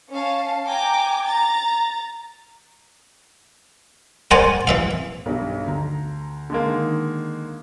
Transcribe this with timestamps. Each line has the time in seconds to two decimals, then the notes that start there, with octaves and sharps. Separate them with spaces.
0.12 C#4 F5 A5
0.66 G5 G#5 A#5 D6
1.27 A#5 A6
4.31 A#4 C5 D5 F#5 G#5
4.67 E3 E5 F5
5.26 B1 G2
5.67 D2 A#5
6.50 D3 G#3 A#3
6.66 D#3